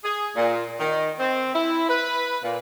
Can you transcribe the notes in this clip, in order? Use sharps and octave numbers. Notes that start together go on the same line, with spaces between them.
G#4
A#2
D#3
C4
E4
B4
A#2